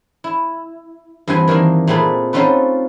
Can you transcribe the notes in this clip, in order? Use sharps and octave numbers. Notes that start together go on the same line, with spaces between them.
E4
G2 E3 C4 B4 G#5
D#3 E3 A#3 D4
A#2 A3 C4 G#4 B4
C4 C#4 D#4 F4 A4 B4